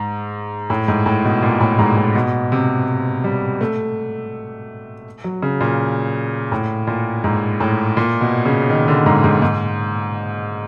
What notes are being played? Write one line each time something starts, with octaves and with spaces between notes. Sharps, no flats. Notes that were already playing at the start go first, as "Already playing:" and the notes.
Already playing: G#2
A2
G#2
A2
B2
A#2
A2
G#2
A2
B2
C3
G3
A3
F#3
C#3
A#2
A2
A#2
G#2
A2
A#2
B2
C#3
D#3
D3
G#2
G#2
G#2